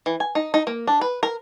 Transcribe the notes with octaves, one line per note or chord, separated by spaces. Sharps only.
E3
G#5
D#4
D#4
A#3
D4
B4
A#4